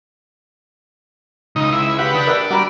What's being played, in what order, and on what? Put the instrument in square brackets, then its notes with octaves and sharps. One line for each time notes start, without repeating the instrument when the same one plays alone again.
[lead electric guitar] C#2 [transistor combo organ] D#4
[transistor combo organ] E4
[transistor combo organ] G4 B4 F#5 [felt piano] F5
[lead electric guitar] D4 [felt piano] D#6
[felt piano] A#4 D5 E6
[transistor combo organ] G3 D5 [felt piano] F#4 A#5 B5